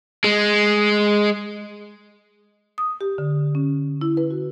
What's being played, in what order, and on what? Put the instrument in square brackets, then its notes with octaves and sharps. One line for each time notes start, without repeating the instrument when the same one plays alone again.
[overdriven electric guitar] G#3
[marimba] D#6
G4
D3
C#4
E4
B4
F#4